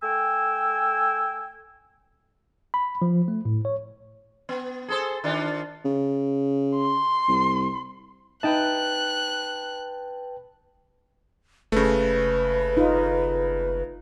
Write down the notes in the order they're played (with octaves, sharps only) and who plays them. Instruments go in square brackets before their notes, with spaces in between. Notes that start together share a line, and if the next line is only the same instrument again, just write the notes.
[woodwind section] A3 G5 G#5 E6
[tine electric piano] B5
F3
A3
A2
C#5
[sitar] B3
G#4 A4 C5
D#3 D4 F4
[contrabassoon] C#3
[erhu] C6
[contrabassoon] C2
[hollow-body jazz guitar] D#4 D#5 E5 [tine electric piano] B4 G5 A5 [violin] F#6
[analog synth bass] F#1 [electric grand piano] C#3 A3 [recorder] B4
[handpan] D#4 F4